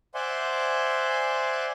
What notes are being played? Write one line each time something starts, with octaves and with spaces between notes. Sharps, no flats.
C5 D5 E5 F#5 G#5 C6